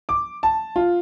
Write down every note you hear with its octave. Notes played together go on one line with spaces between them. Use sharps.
D6
A5
F4